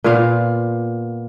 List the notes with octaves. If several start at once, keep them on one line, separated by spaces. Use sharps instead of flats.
A#2 B3 F4 F5